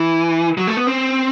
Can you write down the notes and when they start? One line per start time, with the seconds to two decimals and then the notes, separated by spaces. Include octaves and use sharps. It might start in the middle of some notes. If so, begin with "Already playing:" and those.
Already playing: E3
0.57 F#3
0.67 A3
0.77 B3
0.87 C4